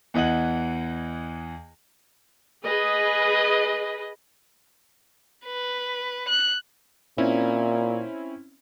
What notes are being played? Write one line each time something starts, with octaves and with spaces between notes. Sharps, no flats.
E2 E3 D#5 F#5 F#7
G#4 B4 D#5
B4
F#6
A#2 C4 C#4 E4